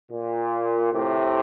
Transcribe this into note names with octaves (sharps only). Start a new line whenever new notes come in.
A#2
A2 C3